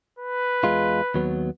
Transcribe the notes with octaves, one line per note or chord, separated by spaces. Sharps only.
B4
E2 G#3 F4
D#2 F#3 B3